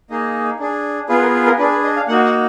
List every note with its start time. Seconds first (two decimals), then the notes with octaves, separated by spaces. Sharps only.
0.10 A#3 D#4 G#4 D#5
0.60 D4 G#4
1.09 B3 F4 G#4 B4
1.22 A#4
1.34 B4
1.46 A#4
1.58 D4 G#4 B4
1.72 B4
1.84 D#5
1.96 F5
2.08 A#3 D#4 F#4 F#5
2.25 F#5